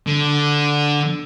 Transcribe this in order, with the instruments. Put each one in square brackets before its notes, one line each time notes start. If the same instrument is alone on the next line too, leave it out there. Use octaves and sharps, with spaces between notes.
[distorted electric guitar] D3